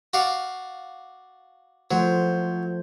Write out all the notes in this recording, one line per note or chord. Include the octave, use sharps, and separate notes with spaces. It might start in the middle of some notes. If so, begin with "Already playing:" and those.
F#4 D5 F5
F3 F#3 A3 C5